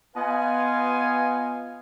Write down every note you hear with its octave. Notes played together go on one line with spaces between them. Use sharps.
B3 F4 B4 D#5 F5 G#5